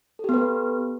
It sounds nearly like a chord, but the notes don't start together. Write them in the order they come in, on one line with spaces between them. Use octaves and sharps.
A4 G4 B3 B4